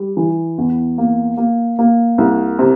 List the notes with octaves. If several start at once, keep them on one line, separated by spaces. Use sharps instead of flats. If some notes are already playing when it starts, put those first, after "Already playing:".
Already playing: G3
E3
E2
A#3
A#3
A#3
C2
C3